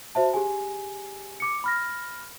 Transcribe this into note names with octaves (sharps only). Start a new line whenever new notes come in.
F#4 C5 E5 A5
G4 G#4 G#5
D6 C#7
B5 F6 A#6